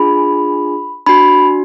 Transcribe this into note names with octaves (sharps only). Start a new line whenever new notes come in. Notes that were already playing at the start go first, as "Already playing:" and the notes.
Already playing: D4 F4 G#4 B5
D4 F#4 B5